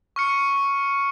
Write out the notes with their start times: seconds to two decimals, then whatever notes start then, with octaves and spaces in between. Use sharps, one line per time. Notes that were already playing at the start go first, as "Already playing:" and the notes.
0.16 C#6 F6 C#7